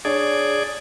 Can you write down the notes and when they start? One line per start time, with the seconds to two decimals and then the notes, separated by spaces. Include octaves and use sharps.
0.05 D4 G#4 C#5 D5